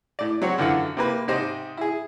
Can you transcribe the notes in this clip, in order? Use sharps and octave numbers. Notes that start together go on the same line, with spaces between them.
A2 D5
F#3 C4 C#5 F#5
F#2 D3 E3 F4 F#5
C3 A#3 B4
G#2 C3 G4 C5 D#5
E4 G#4